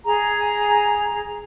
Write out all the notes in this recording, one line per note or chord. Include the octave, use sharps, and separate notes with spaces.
G#4 A#5